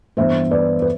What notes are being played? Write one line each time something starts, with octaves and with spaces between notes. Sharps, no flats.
G2 E3 B3 C5 E5
B4 D5
B4